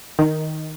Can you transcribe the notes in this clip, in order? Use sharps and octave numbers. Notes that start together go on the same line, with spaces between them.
D#3